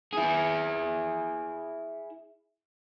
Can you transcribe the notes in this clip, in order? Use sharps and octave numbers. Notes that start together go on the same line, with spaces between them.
E4 G#4